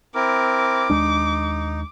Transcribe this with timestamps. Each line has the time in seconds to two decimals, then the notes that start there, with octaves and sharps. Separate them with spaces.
0.15 C4 E4 A#4 D6
0.90 D#2 G#3 D4 D#4